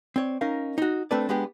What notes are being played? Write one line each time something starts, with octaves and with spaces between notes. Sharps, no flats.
C4 C#5 D5
C#4 D#4 A#4 F5
D#4 F#4
A3 C4 D4 A4 B4 D5
G#3 B3 D4 G4